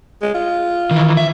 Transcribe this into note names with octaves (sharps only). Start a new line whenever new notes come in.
G#3
F4
D#3 E3
E5